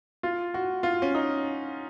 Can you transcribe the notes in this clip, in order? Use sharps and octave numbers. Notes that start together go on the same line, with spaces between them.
F4
F#4
F4
C#4
D#4